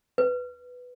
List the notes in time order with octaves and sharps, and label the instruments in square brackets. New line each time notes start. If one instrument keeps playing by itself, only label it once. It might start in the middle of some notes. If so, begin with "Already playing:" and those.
[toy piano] B4